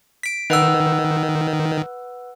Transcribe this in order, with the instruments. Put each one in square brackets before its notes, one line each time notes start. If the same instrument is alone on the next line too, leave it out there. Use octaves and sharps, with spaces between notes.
[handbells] B6 D7
[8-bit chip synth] D#3 [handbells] B4 F#5 E6